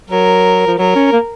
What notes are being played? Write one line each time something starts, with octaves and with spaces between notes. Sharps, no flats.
F#3 A#4
F3
F#3 A#4
C#4
A#3